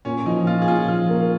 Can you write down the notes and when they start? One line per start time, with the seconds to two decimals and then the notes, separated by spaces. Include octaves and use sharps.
0.05 A#2 C#4
0.26 F3 D#4
0.47 A#2 F4
0.62 G#4
0.68 A#2 F4
0.88 F3 F4
1.09 A#3